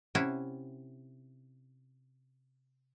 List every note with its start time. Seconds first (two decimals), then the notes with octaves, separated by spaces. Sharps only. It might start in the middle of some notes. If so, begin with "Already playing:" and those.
0.15 C3 C#4 E4 F#5